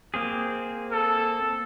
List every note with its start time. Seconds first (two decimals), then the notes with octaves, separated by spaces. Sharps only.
0.14 A#3 C4 G#4
0.92 A4